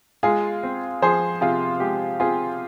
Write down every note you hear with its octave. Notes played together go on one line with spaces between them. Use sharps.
G#3 F4 G#4
C4
F3 G#4 C5
C3 F4 G#4
G#3 G4
C4 F4 G#4